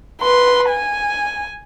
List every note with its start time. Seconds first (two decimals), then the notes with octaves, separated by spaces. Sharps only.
0.21 B4 C6
0.69 G#5